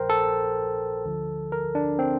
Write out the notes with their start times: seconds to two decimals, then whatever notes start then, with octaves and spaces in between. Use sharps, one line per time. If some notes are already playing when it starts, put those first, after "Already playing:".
Already playing: A#1 A#2 F3 A#4 C5 G5
0.10 A4
1.04 D2 D3 F3
1.52 A#4
1.75 D4
1.99 C4